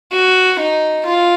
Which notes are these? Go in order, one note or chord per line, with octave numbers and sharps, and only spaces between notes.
F#4
D#4
F4